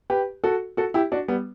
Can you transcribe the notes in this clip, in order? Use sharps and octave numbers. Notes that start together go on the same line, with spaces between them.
G4 B4
F#4 A4
F#4 A4
E4 G4
D4 F#4
G3 B3